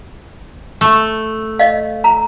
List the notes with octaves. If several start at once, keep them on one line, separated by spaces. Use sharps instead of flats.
A3
D#5 F5
A#5